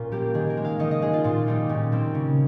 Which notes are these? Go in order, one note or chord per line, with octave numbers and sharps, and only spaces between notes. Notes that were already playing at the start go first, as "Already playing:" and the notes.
Already playing: A#2 C#4 F4 A#4
G3 A#3 G4
D#3 G#4
A#4
G#3
F5
D#3 D#5
D#5
G#3 G#4
F4
A#2 F4
G3 A#3 D#4
A#2 C#4
G3 A#3 C4
C#3 C#4